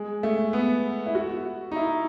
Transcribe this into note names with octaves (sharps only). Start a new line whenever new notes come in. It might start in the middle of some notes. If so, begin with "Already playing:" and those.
Already playing: G#3
A3
B3
E4
F#4
D#4
E4